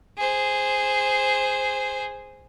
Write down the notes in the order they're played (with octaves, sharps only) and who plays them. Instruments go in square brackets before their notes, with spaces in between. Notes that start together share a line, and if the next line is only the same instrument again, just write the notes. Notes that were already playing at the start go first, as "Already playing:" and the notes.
[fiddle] G#4 C5